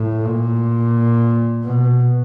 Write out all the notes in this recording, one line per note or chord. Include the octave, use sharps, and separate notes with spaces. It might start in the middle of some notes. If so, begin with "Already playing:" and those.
Already playing: A2
A#2
B2